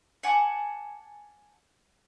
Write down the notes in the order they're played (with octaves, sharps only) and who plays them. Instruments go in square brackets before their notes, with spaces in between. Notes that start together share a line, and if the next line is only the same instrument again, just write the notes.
[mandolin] F#5 G#5 A5 D6